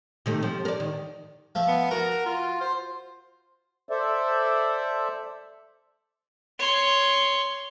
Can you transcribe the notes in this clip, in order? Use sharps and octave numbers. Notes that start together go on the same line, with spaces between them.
C3 D#3 A3
F3
A#4 D5
D#3
F3 A3
B3
F#4 A#4
F4
C5
A4 C5 D5 E5
C#5 C6